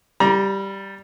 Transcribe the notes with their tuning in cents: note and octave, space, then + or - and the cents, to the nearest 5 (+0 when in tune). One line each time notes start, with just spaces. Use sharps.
G3 +0 A#5 +30